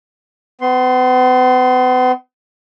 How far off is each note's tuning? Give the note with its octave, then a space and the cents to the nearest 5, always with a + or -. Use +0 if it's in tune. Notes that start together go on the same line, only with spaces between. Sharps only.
B3 +40 C6 +0